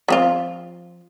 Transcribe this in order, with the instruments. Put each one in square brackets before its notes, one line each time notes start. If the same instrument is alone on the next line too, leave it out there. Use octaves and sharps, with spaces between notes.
[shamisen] F3 C4 F4